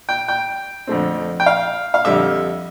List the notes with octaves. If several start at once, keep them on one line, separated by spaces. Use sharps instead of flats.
G5
G5
F2 D3 A3 C4
G5
F5
F5
F2 D3 G3 E5